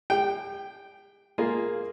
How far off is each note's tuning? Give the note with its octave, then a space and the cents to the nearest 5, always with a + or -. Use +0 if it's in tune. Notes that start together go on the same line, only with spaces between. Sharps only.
G4 +40 G5 -5
A#3 +0 F4 -5 G#4 +0